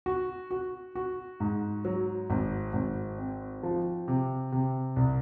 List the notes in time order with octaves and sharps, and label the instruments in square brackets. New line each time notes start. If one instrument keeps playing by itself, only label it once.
[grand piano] F#4
F#4
F#4
G#2
F#3
G#1
G#1
C4
F3
C3
C3
C2